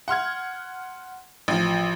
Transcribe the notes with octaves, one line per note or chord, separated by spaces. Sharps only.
F#5 C6 F6 G#6
A1 F3